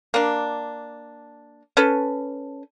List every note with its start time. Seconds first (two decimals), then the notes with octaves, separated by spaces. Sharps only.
0.14 A#3 D4
1.77 C#4 A4 B4